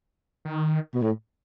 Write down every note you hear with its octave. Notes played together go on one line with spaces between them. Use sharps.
D#3
B2
A2